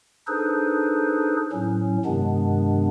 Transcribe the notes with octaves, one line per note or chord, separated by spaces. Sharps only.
D4 D#4 G#4 A4 B4 C5
A2 F#3 C#4
G2 C3 D#3 G#3 B3 D4